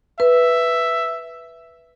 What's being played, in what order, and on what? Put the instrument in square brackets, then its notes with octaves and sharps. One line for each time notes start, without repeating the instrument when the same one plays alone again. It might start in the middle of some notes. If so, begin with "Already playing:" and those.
[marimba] B4 [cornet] E5